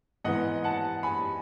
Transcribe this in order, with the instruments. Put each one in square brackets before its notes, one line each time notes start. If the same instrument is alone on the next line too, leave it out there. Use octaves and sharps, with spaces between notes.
[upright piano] G#2 E3 B3 D#5 F#5
F#5 A5
G#5 B5